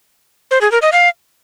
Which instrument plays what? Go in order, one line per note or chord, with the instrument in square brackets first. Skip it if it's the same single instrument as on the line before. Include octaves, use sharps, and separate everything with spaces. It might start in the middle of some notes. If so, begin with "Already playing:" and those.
[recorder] C5
G#4
A#4
D#5
F5